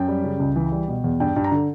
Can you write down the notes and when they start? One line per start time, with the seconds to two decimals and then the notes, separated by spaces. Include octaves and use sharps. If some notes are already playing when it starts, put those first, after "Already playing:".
Already playing: F#2 G5
0.08 G3
0.24 C#3
0.40 C#2
0.56 E3
0.72 G3
0.88 B2
1.04 E2
1.20 G2 G5
1.36 G2
1.44 A#5
1.51 D3